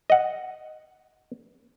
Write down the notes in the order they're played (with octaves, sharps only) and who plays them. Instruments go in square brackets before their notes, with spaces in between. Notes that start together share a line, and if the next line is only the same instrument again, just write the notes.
[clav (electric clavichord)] D#5 F#5